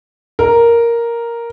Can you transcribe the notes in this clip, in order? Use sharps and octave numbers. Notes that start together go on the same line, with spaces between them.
A#4